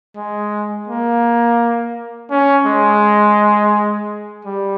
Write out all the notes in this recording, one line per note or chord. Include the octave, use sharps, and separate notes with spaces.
G#3
A#3
C#4
G#3
G3